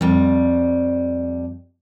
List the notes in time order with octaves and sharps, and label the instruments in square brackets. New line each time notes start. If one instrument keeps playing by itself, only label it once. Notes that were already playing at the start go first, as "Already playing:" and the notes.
[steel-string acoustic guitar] F2 G3